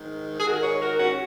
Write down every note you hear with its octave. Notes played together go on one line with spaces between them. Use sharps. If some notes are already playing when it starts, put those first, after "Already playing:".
Already playing: G#2 D#3
G#4
G#2 D#3 F#4 A#4
G#4 C#5
F#4 A#4
C#4 F#4